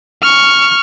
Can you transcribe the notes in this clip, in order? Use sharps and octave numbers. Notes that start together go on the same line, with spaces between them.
C#6 F6